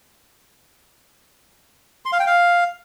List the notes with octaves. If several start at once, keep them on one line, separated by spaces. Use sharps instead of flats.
C6
F5
G5
F5